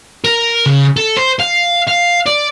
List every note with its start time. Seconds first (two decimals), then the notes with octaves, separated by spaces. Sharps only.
0.25 A#4
0.66 C#3
0.97 A4
1.17 C5
1.40 F5
1.88 F5
2.27 D5